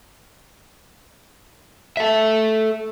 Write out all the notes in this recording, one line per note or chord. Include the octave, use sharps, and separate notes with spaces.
A4 E5